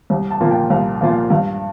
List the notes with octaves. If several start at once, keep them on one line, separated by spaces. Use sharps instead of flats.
C2
A5
A#2 F3 A#3 F4
G5
C2 F5
A#2 F3 A#3 F4
G2 F5